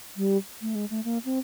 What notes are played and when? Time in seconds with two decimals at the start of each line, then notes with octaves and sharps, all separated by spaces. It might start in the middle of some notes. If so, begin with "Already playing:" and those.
0.17 G3
0.62 A3
0.75 G#3
0.90 A3
1.05 A#3
1.25 C4